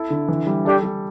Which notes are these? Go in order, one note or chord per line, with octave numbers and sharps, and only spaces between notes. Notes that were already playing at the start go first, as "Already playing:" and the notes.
Already playing: E4 A4
D3
E3
G3
D4 G4 A4
G3